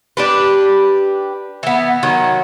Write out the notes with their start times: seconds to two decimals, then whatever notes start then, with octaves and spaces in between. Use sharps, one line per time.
0.17 D4 G4 B4
1.63 E3 B3
2.03 D#3 F#3